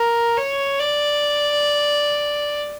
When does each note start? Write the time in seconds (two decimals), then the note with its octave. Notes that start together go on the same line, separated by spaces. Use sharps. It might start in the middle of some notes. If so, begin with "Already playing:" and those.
Already playing: A#4
0.37 C#5
0.80 D5